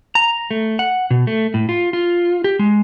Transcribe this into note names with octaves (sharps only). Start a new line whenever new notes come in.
A#5
A3
F#5
B2
A3
A2
F4
F4
G4
G#3